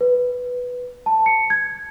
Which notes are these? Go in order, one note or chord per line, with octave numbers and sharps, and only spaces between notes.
B4
A5
C#7
G#6